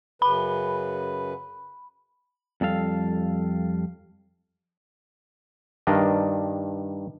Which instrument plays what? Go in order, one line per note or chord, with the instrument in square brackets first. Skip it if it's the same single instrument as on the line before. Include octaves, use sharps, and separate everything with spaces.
[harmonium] F#2 C#3 B4 [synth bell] B5
[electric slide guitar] F2 G3 A4 F5
[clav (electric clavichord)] G2 D#3 D4 A#4 D#5